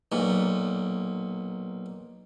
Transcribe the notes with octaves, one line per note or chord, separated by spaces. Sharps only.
B1 A#2